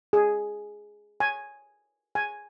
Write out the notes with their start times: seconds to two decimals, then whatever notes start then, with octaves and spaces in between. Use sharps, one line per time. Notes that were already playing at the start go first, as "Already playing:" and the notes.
0.13 G#4
1.20 G#5
2.15 G#5